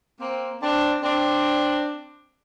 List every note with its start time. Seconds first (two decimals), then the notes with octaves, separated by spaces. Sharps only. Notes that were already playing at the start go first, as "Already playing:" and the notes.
0.20 A#3 C4
0.62 C4 D4
1.03 C4 D4